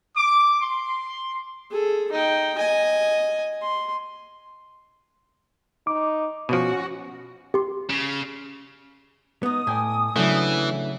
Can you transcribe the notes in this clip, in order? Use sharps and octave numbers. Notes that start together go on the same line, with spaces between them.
D6
C6
G#4 A4
D#4 G5
D#5 G#5
C6
D#4 D6
B2 F3 C#4 F#4
G4 C6
C#3
B3 D#4 D#6
A2 D5 G5 G#5
C#3 E3 F#3 A3 D4 E4